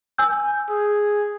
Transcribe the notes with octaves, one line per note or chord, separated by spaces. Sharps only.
G#5 E6 G6
G#4